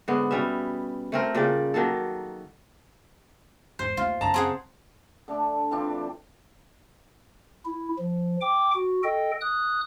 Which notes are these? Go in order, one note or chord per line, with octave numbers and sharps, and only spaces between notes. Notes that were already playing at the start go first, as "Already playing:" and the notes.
G#2 D3 B3
B2 G3 C#4 E5
A3 C4 A#4
A#2 C#3 G3 D5
D#3 F#3 A#3 A4
G#1 E2 C5
D#2 A3 F4
F#2 C#3 A5 A#5
C4 G#4 F#5
D3 A3 D4
E3 C4 D4 F4
E4
F3
G5 D6
F#4
A4 D#5 G5
D#6 F#6